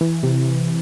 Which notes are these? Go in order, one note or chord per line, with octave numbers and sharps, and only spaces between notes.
E3
C3